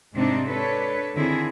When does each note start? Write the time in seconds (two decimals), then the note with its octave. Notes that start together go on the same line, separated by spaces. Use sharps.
0.15 G#2 C3 C4 D4 D#4
0.47 D4 A4 B4 C#5
1.15 D3 D#3 C4 E4 G#4